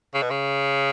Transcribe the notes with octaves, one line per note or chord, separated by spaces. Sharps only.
C#3
B2
C#3